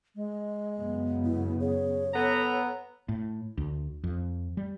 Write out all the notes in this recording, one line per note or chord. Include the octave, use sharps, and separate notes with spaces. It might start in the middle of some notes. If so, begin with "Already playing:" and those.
G#3
F#2 C#3 B3
E4
G#4 C#5
B3 A4 A#5
A2
D2
F2
G3